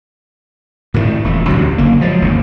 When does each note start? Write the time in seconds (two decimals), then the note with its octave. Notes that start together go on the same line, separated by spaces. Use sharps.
0.94 A2 D#3 F3 A3
1.24 E1 A3
1.47 A1 D2 C3 F#3
1.78 F#1 D3 A#3
2.01 F3 F#3 G#3
2.22 G1 D#2 C#3